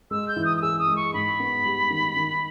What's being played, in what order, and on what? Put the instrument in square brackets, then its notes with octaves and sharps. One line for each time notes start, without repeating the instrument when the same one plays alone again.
[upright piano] G#3 [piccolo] E6
[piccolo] G6
[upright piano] E3
[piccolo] D#6
D#6
[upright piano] G#4 [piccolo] E6
[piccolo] D#6
[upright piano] G#3
[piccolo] C#6
[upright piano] G#2 [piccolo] B5
[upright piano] B3
G3
D#3
D#3